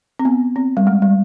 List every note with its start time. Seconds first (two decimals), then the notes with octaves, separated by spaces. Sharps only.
0.19 C4
0.25 B3
0.56 C4
0.77 G3
0.87 G#3
1.02 G3